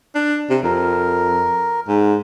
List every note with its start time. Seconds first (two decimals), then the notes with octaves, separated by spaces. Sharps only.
0.15 D4
0.50 C3
0.63 F2 A#4
1.88 G#2